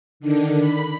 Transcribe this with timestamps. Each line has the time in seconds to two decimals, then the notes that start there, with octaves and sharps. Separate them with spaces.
0.20 D3 D#3 D4
0.60 B5